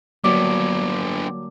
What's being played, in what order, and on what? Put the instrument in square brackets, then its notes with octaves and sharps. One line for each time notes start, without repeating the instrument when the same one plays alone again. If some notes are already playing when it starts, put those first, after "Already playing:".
[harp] D3 G3 A#3 [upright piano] F#3 [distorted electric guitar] B3 D4 [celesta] D6